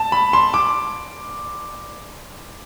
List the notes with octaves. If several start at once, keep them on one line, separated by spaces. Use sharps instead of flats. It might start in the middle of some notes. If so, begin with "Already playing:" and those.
Already playing: A5
B5
C6
D6